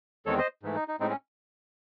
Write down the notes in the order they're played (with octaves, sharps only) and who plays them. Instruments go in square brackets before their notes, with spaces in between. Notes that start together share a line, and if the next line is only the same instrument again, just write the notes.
[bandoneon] E2 D#3 G#3 C4 A4 C#5
C5 D#5
G#2 E3 A3
D#4
D#4
A2 G#3 C4 D#4
C#4